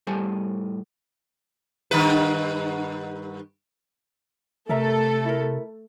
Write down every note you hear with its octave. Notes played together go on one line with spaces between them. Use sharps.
A2 G3 A4 C5 G#5 A5
G2 D#3 B4
C3 A3 A4 A#4 E5 A#5
E4 A#4